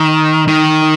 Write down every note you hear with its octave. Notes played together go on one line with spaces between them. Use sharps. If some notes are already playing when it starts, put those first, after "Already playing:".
Already playing: D#3
D#3